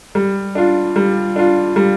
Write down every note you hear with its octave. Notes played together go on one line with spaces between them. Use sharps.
G3
D4 F4
G3
D4 F4
G3